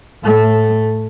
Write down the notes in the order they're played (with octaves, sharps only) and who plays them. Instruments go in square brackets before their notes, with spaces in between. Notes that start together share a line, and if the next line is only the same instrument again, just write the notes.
[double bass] A2 A3